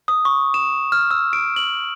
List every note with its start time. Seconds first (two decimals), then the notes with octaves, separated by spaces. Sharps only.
0.08 D#6
0.25 C#6
0.54 E7
0.92 F6
1.11 E6
1.33 D7
1.56 F#7